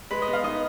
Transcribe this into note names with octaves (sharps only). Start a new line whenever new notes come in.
G#3 B4
D#5
B3
F5
D#3 D#5